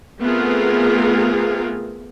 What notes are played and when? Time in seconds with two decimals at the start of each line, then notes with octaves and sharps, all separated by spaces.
0.21 A3 B3 C4 F4 G#4 A#4